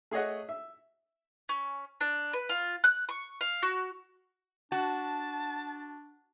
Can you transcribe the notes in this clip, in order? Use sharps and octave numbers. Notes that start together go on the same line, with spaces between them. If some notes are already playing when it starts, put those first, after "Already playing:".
A3 G#4 C#5 D#5 F#5
E5
C#4
D4
B4
F4
F#6
C#6
F5
F#4
D4 F#4 A5